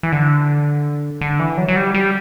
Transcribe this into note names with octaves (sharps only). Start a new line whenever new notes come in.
E3
D3
D3
E3
F#3
F#3
G3
G3